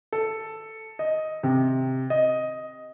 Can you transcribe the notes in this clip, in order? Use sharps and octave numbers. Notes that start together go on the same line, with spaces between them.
A4
D#5
C3
D#5